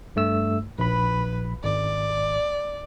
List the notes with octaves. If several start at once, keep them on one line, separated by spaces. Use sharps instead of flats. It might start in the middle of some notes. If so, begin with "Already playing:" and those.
G2 A3 E6
A#1 B4 B5
G#1 D5